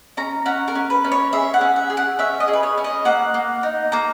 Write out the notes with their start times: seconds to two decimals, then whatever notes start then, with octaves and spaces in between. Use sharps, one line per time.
0.17 C#4 A#5
0.46 C#4 F#5
0.68 A#4
0.75 C#4
0.90 B4
1.04 C#4
1.12 C#5
1.33 G#4 E5
1.54 F#5
1.61 C#4
1.76 E5
1.90 G#4
1.97 F#5
2.19 C#4 E5
2.40 D#5
2.48 G#4
2.53 B4
2.63 C#5
2.78 C#4
2.84 D#5
3.05 A#3 F#5
3.34 A#3
3.63 D#4
3.92 A#3 A#5